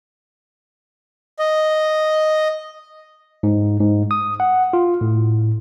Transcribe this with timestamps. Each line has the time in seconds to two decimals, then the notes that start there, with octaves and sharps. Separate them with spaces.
1.39 D#5
3.43 G#2
3.80 G#2
4.11 D#6
4.40 F#5
4.73 F4
5.01 A2